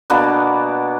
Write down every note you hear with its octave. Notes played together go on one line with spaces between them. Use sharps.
B2 A#3 B3 D4